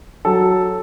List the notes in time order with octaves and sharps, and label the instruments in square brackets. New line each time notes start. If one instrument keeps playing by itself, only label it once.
[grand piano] F#3 A4